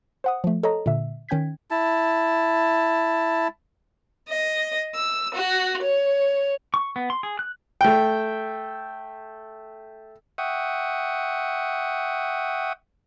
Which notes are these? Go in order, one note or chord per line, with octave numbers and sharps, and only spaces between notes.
C5 F#5 D#6
F3 A3
A4 C#5 D#5 A#5
A#2 D3 E5
D#3 C#4 G5 G6 G#6 B6
E4 A5
D#5
E6
F#4
C#5
C#6
B3
C6
G#4
F#6
A3 G5
E5 F#5 G5 C#6 D#6